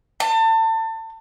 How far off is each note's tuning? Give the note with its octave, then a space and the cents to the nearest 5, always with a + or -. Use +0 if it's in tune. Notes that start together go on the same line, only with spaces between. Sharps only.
A5 +30